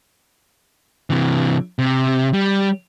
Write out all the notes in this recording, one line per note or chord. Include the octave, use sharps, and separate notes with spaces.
C3 E3
C3
G3